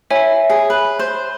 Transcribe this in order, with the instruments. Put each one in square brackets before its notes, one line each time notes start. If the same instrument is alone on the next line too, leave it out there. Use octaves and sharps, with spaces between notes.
[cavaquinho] E4 [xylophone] C#5 E5 G#5
[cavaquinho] G#4
B4
C5